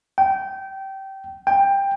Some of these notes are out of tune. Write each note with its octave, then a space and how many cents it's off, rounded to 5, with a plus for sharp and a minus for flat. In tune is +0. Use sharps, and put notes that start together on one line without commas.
G5 -20
G5 +15